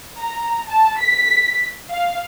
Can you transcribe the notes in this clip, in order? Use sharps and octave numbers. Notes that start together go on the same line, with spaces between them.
A#5
A5
B6
F5